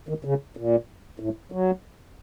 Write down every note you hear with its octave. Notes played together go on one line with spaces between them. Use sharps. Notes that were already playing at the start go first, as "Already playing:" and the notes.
D#3
C#3
A#2
A2
F#3